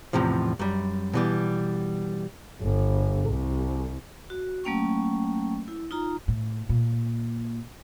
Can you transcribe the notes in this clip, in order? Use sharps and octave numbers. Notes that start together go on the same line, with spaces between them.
E2 A2 C3 F3
F#2 G3
B2 E3 G3
G1
C2
F#4
F#3 A3 A#3 C#4 G5 C#6
E4
D#4 F4 A#5
A2
A#2